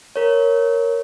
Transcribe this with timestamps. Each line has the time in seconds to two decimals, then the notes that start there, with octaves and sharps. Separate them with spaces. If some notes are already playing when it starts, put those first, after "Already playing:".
0.16 A#4 C#5